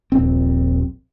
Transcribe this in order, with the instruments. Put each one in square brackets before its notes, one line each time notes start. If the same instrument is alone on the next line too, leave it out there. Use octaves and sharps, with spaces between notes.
[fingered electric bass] D#1 A#1 C4